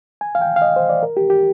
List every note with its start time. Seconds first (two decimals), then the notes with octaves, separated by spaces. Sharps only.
0.21 G#5
0.35 F5
0.41 G5
0.56 F5
0.62 D#5
0.76 C5
0.89 D5
1.03 A#4
1.17 G4
1.30 G4